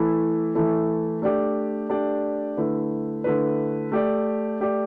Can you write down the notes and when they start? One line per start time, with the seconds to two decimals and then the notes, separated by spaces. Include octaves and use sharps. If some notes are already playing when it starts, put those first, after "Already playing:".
Already playing: E3 A3 E4 A4
0.55 E3 A3 E4 A4
1.22 A3 D4 G4 D5
1.90 A3 D4 G4 D5
2.57 D3 A3 E4 B4
3.24 D3 A3 E4 B4
3.92 A3 G4 D5
4.60 A3 G4 D5